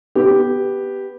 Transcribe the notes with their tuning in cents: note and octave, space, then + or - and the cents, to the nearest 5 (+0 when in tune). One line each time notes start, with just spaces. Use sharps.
B3 +0 G4 +0